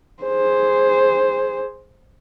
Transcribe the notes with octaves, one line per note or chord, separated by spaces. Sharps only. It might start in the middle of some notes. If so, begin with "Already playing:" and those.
G#4 C5